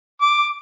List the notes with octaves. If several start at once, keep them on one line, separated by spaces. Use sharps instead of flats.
D6